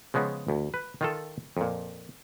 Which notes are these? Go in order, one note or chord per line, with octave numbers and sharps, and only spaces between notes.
C#3 F3 G#3 B3
D2
B4
D#3 F4 A4
F2 A#2